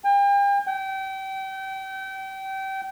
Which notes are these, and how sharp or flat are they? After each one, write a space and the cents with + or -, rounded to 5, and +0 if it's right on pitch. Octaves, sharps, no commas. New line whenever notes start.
G5 +40
G5 -30